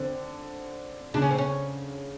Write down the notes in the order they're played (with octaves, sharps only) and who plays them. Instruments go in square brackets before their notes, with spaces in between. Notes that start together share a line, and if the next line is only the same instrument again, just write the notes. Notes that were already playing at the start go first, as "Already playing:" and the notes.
Already playing: [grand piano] D3 [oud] C4
[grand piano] C#3 [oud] D4
[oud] C#4
C4
C#4